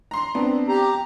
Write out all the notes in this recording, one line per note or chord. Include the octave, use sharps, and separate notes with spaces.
A#5 C6
B3 C4 D4
G4 A#5